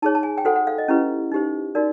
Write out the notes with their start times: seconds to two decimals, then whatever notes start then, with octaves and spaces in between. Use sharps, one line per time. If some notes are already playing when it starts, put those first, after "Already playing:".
0.02 D#4 G#4 C#5 A5
0.15 A5
0.23 G#5
0.38 G5
0.45 F#4 A4 C5 F#5
0.56 F#5
0.67 F5
0.78 D#5
0.88 C#4 E4 G4 B4
1.32 D#4 G4 C5
1.75 D#4 F#4 A#4 D5